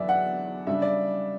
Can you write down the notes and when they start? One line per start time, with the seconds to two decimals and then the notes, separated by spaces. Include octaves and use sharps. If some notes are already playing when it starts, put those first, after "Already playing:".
Already playing: E2 D3 F#3 B3 D4 D5 E5
0.09 F#5
0.67 C#3 G3 D4 E5
0.82 D5